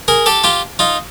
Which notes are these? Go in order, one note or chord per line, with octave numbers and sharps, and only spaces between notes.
G#4 A#4
G4 A4
F4 G4
D#4 F4